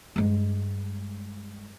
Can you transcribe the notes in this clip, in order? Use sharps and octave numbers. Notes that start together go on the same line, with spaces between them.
G2 G#3